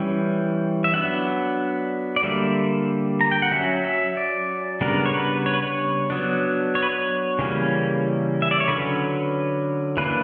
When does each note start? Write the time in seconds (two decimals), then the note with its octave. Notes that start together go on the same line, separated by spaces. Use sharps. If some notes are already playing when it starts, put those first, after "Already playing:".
Already playing: E3 G3 C#4 G5
0.84 E5
0.94 F#3 B3 D4 F#5
2.16 D5
2.23 D3 G3 A#3 E5
3.21 A#5
3.31 G5
3.42 F#5
3.52 F#3 C#4 E5
3.85 E5
4.17 D5
4.81 C#3 G3 B3 D4 A#4
5.06 C#5
5.14 B4
5.46 C#5
5.54 B4
5.62 C#5
6.10 F#3 B3 D4
6.75 C#5
6.83 B4
6.89 C#5
7.39 C#3 E3 G3 A#3 C#4
8.42 E5
8.51 D5
8.60 C#5
8.68 D3 F#3 C#4 B4
9.97 E3 A#3 D4 B4